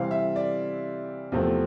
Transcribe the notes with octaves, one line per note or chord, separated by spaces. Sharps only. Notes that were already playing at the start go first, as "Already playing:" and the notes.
Already playing: C3 E3 G3 C4 F5
E5
D5
E2 C3 F3 A3 C4